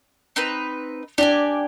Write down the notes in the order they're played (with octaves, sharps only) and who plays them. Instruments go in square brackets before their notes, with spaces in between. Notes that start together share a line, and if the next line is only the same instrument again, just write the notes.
[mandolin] C4 D#4 B4
[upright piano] D4 [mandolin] G4 D5 G#5